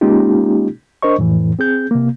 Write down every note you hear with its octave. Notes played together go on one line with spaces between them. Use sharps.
G#3 A#3 C#4 D#4 F4 G4
D4 A#4 C5 D#5 C#6
F2 A2 E3
C4 G#4 G6
C3 A#3